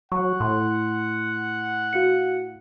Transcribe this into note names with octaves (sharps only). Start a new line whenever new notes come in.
F#3 F#5 C#6
A2 C6
F#4 F5 C#7